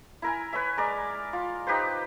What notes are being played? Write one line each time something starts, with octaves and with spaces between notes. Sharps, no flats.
E4 A#4 G#5
B4 C#5 E5
G#3 A#4 D5
F4
D#4 G4 B4 C5